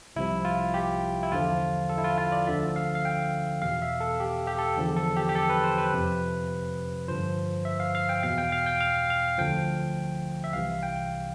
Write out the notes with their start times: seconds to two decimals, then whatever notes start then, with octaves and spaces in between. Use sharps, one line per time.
0.16 C2 C3 F3 E4
0.45 F4
0.74 G4
1.23 E4
1.31 E2 D3 F3 F4
1.89 A4
1.98 E4
2.04 F4
2.18 F4
2.32 D5
2.47 D2 D3 F3 E5
2.76 F5
2.95 F5
3.05 G5
3.62 E2 B2 F5
3.82 E5
4.00 A4
4.20 G4
4.47 G4
4.58 A4
4.77 E2 D3 F3
4.96 A4
5.17 G4
5.29 G4
5.35 A4
5.50 B4
5.64 C5
5.78 B4
5.92 F2 C3 F3
7.08 G2 D3 F3 C5
7.65 E5
7.80 F5
7.95 F5
8.09 G5
8.23 E2 B2 F5
8.38 G5
8.52 F5
8.66 G5
8.81 F5
9.10 F5
9.38 D2 D3 F3 G5
10.44 E5
10.53 C2 C3 E3 F5
10.83 G5